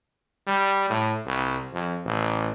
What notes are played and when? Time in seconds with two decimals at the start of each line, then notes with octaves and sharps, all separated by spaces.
0.47 G3
0.90 A2
1.26 C2
1.73 F2
2.05 A1